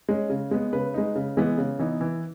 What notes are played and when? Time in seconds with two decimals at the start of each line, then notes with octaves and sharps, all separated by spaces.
0.09 G#3 C#4
0.30 C#3
0.51 G#3 B3
0.73 C#3 B4
0.94 G#3 D#4
1.15 C#3
1.37 E3 G#3 B3
1.58 C#3
1.79 E3 B3 D#4
2.01 E3